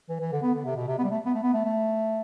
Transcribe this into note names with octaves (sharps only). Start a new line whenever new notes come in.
E3
E3
D3
B3
D3
C3
B2
C3
B3
G3
A3
B3
A3
B3
A3
A3